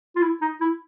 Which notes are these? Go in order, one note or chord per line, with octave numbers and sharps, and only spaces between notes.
F4
E4
D#4
E4